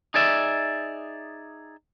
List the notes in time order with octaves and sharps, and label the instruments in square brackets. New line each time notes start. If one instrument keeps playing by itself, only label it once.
[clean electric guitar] D#4 G#4 D5 E5